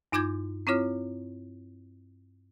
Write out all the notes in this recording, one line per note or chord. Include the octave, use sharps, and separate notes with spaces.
G2 D#4 F4 D6 G6 G#6
C4 E4 F4 C#5 F6